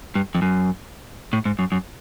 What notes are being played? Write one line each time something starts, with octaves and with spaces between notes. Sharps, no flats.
G2
F2
F#2
A2
G#2
F#2
F#2